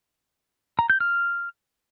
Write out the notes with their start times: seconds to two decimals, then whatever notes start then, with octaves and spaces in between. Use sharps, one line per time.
0.79 A#5
0.90 G6
1.00 F6